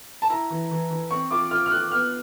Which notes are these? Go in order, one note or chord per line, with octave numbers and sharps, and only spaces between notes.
A5
E4 A#5
E3
E3
E3
C4 C#6
F4 D6
F4 F6
F6
F4 F#6
B3 F6